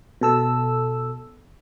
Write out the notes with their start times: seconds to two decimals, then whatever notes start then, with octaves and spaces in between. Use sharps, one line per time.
0.21 B2 A4 E6